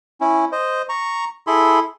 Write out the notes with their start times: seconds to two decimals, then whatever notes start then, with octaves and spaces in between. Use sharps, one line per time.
0.21 C#4 E4
0.52 C5 D#5
0.89 A#5 C#6
1.47 E4 G#4 A4 B5 C6